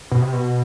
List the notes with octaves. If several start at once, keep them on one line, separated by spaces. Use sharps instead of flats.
B2
C3
B2